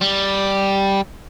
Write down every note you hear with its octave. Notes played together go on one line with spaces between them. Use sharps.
G3